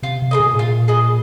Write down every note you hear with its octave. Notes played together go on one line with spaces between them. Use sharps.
C3 F4
C3
G#4 B4 D#5
B2
A2
A#2 F4
G#4 B4 D#5